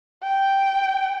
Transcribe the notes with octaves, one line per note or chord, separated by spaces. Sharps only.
G5